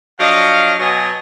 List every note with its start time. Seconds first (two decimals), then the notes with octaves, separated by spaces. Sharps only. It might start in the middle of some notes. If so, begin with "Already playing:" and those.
0.20 F3 F#3 D4 D#5 F5
0.80 B2 F#3 B3 D#5 G#5